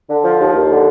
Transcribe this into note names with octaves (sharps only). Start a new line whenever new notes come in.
D3
F3
D#2
D#2
D3